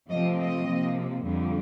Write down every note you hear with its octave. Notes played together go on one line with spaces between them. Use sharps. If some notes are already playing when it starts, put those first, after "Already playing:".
C3 F3 A3 C4 D#5
D#5
C3 F3 A#3
F2 D3 G3